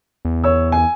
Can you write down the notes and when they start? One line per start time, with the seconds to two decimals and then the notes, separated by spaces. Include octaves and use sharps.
0.25 E2
0.44 C#5 E6
0.72 G#5